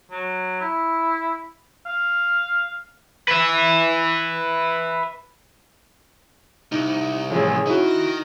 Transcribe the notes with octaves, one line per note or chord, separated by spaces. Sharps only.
F#3
E4
F5
B4 E5
C2 D#4
A1 F3 C#4 G#4
D#4 E4 F#4 A#4
A#6